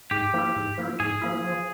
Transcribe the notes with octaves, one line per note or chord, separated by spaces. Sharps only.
G#2 G4
F3 A#3 E4
G#2
F3 A#3 E4
G#2 G#4
F3 A#3 E4
F3